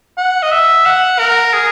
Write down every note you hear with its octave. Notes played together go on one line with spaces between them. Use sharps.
F#5
D#5
E5
F#5
A#4
G#4